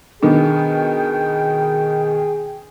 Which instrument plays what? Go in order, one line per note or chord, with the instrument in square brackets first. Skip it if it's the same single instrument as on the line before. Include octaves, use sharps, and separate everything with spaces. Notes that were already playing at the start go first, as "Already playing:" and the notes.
[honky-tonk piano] B2 D#3 B3 [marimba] D4 [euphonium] G#4 [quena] G5